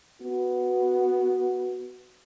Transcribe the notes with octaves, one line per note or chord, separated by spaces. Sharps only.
B3 F#4